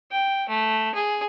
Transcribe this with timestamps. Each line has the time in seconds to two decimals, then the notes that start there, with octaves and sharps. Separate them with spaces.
0.11 G5
0.49 A3
0.94 G#4